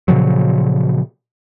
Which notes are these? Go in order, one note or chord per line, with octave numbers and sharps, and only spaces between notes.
A#2 C#3 F3 F#3